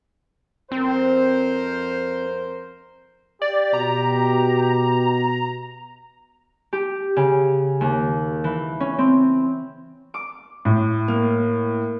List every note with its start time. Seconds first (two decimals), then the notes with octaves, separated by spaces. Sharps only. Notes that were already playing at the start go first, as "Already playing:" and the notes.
0.72 F2 C4 A#4 C5
3.42 G4 D5
3.74 B2 A#5
6.73 G4
7.17 C#3
7.81 D#2
8.44 E3
8.80 C#4
8.99 C4
10.14 D6
10.65 A2
11.08 A#3